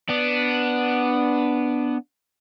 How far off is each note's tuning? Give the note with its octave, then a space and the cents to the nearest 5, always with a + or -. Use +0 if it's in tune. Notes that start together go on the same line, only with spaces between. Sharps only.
B3 +0 D4 +0